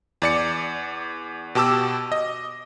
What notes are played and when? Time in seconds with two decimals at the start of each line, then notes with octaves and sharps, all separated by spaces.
0.22 E2 D5 C#7
1.55 B2 G4 A5 D6 E6
2.12 D#5